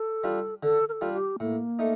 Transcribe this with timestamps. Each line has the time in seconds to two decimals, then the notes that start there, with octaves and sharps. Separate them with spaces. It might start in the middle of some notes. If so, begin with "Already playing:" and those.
Already playing: A4
0.24 G3 D4 F4
0.63 D3 A4
0.89 A#4
0.92 A4
1.01 G3 D4 F4
1.14 G4
1.40 A2 A#3
1.79 A3 D#4